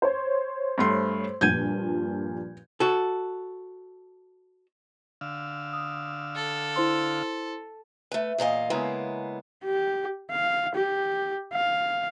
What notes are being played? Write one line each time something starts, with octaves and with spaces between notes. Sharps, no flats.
C5 C#5
G2 A3 C6
G2 A#2 F3 G6 G#6 D#7
F#4 A4
D3 F5 E6
D#6
A4
E4 C5 C6
A3 B4
E2 A#2 D#5 F5
C#3 G#3 A#3 B3 E4
G4
F5
G4
F5